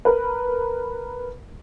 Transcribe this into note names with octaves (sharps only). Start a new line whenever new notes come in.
A#4 B4